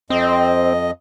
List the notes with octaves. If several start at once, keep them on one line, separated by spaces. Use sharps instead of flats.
F2 C4 D#5